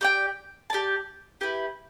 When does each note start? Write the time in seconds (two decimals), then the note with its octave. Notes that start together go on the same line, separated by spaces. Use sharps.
0.01 G4 D5 G5
0.70 G4 D5 A5
1.41 E4 G4 B4